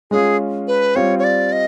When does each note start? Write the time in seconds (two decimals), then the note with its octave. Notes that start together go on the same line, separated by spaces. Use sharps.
0.11 G#3 C#4 F4 G#4
0.68 B4
0.96 G3 C4 F4 C#5
1.19 C#5
1.24 D5
1.52 D#5